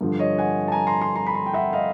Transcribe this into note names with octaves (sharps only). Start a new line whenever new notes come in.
G2 D3 F3
C#5 D#5
F#5 G#5
A5
G#5 A#5
A#5 C6
A#5 C6
A#5 C6
B5
A#5 C6
G5
E5 F#5
D#5 F5